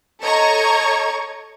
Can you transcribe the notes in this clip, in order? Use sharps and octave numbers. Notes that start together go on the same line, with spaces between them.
A4 C#5 D#5 A#5 C#6 G#6